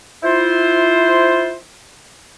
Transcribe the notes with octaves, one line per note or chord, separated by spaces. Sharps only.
E4 F4 C5